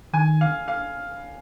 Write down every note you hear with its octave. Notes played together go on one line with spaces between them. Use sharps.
D#3 G#5
F5
F5